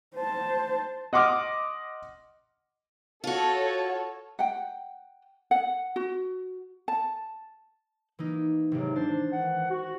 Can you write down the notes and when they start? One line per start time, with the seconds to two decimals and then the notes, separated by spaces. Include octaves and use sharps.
0.16 C5 A5
1.13 D#5 F#5 C6 D6 D#6 F6
3.24 F4 F#4 A4 C#5
4.39 F#5 G5
5.51 F#5
5.96 F#4
6.88 A5
8.19 E3 A#3 D#4
8.72 G#1 C3 F#3 A#3
8.96 D4 C5 A6
9.32 D#3 E3 F#5
9.70 F#4